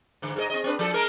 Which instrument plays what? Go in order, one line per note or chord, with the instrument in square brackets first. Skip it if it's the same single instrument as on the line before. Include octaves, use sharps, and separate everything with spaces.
[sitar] G#2 D3
G#2 A4 D#5
C4 D#5
C4 D4 B4
F3 A4
G#3 A#4